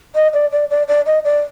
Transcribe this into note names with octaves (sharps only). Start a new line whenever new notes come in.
D#5
D5
D5
D5
D5
D#5
D5